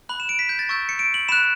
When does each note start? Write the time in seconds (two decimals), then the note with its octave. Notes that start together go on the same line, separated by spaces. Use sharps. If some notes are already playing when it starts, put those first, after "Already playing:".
0.09 B5 F#6 F#7
0.20 E7
0.29 D7
0.39 B6
0.49 G6
0.59 A6
0.69 C#6 E6 G6
0.89 C#7
0.99 D7
1.14 F#7
1.28 B5 F#6 E7